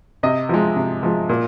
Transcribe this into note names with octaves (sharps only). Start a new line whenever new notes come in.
C3 D#5
F3 G#3
C3
F3 G#3
A#2